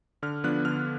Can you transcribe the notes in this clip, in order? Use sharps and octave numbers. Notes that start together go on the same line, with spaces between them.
D3 F6
F3 B3 D4 F#6
D3 F6